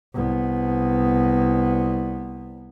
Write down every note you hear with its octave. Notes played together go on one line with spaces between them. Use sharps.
C2 B3